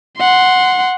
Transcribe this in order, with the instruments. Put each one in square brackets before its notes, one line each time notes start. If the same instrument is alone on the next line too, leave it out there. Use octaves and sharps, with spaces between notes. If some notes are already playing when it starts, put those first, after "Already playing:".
[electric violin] F#5 C6